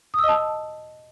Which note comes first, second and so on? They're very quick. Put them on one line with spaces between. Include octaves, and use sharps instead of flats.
D#6 E6 D#5 A5